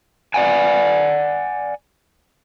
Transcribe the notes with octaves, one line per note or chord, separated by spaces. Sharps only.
D5 E5 F#5 G#5